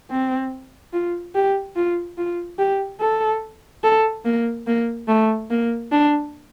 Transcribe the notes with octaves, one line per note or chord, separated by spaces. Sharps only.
C4
F4
G4
F4
F4
G4
A4
A4
A#3
A#3
A3
A#3
D4